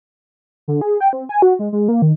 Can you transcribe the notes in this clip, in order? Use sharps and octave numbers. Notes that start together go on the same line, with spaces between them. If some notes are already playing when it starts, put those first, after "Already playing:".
D3
G#4
G5
C4
G#5
F#4
G#3
G#3
A#3
D#3